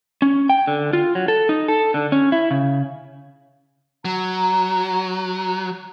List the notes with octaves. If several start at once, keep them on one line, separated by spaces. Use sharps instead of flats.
C#4
G5
D3
F4
F#3
A4
D#4
A4
D3
C#4
E4
C#3
F#3 A#5